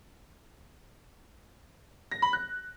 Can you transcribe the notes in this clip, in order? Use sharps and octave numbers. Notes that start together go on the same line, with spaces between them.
A#6
B5
F#6